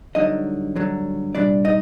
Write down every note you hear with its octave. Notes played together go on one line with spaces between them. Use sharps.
G2 D3 F#3 D#4 D#5
G2 D3 F#3
C2 A#2 G3 D4 D5
D#4 D#5